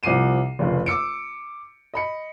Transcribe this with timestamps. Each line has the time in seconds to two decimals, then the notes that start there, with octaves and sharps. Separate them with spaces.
0.03 C2 F3 D6 C7 D#7 E7
0.59 F1 C#2 D#3
0.86 D6 E6 C#7 D7
1.94 D#5 B5 C#7